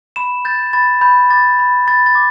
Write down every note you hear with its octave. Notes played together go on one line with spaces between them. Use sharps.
B5 E7
G6 A6
B5 A6
B5 G6
D6 A6
B5
B5 A6
A6
D6